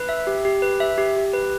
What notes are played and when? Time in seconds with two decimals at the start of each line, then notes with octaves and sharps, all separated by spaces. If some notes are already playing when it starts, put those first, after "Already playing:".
Already playing: B4
0.09 E5
0.27 G4
0.45 G4
0.62 B4
0.80 E5
0.98 G4
1.16 G4
1.33 B4